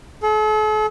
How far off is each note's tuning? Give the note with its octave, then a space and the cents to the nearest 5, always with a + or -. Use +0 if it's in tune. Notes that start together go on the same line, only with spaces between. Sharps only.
A4 -45